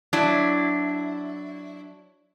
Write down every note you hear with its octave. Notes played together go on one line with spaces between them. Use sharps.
F#3 D4 E4